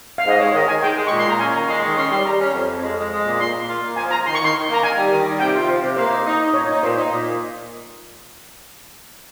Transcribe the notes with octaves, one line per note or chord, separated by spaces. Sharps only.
F5
G#2 D#5
G#3 C#5
D#3 D#5
D#3 G#5
G#3 G5
G#3
A#2 C#6
C6
A#2 A#5
C#4 G#5
D#3 A#5
G#3 C6
D#3 C#6
C#4 C6
G3 C6
G3 A#5
C#4
F2
F2
G#3
G#3
G#3
A#2
A#2 C6
A#2
F4
A#3
F3 G#5
F4 A#5
D#3 C6
C#6
D#3 C6
D#3
A#3 A#5
D#3 G#5
G3
D#3
G3
C3 G5
F4
F3
C3
A#3 C5
D#4
D#4
D#4
A#2 C#5
D#4
A#2 C5
D#4
A#2